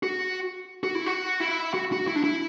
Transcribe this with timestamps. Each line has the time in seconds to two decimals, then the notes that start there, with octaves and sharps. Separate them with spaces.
0.03 F#4
0.83 F#4
0.95 E4
1.06 F#4
1.40 E4
1.74 F#4
1.92 F#4
2.08 E4
2.16 D4
2.24 E4